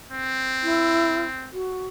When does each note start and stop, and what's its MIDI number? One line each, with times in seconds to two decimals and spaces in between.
0.12 1.52 60
0.63 1.21 64
1.53 1.87 66